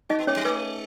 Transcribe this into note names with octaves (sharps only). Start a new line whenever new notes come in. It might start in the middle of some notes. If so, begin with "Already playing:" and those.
D#4 F#4 D#5
B3
G#3 C#4 C#5
F#3
G#3 B4